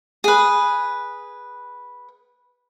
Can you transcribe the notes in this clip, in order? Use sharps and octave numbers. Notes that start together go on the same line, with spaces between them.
G#4 B4